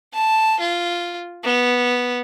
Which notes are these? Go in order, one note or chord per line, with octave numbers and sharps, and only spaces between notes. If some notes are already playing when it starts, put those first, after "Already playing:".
A5
F4
B3